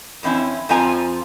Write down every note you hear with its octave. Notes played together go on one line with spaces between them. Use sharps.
F2 E3 C4 C#4 E4
F2 F3 C4 F4 G#5 A#5